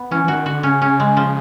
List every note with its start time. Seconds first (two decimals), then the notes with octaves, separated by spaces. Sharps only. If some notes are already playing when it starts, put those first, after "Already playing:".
Already playing: B3
0.11 E3 C#4
0.24 E3
0.28 D#3 F#4
0.46 D3 F#4
0.63 C#3 C#4
0.82 C#4
1.00 G#3
1.17 F3